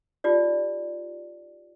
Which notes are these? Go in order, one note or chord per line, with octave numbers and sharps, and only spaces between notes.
D#4 F4 G4 D5